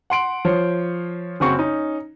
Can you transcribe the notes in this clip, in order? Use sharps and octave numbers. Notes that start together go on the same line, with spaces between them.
F#5 C6 D7 F#7
F3 C5 C#5
F#1 C#3 C4 F#4 C#6
C#4 D#4